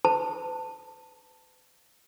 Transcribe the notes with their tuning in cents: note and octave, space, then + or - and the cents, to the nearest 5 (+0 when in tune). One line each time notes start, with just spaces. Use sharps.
B4 +40 A5 +15